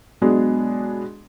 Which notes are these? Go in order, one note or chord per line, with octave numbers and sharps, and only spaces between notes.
B2 F#3 G#3 B3 D4 G#4